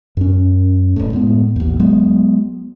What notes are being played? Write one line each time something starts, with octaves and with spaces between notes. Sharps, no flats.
F#2 C#4
D1 G1 A2
A2 G#3 B3
A1 D#2
F#3 G#3 B3